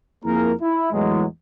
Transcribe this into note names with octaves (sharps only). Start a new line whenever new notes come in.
F2 A#3 E4 G#4 A#4
E4
E2 A2 E3 F#3 G#3